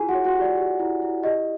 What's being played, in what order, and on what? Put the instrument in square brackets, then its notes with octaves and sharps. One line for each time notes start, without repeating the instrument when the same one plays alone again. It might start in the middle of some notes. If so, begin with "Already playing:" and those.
Already playing: [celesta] E4 F4 G#4 G#5
F#4 F#5
C#5
F#4 F#5
G4 D5
G4
E4
E4
G4 D#5